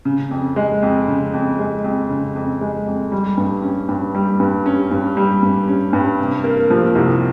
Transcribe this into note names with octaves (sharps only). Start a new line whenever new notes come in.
C#3
F2
G#3
F2
C#3
F2
G#3
F2
C#3
F2
G#3
F2
G3
G2
C#4
G2
G3
G2
C#4
G2
G3
G2
C#4
G2
C3
A#3
F3
C2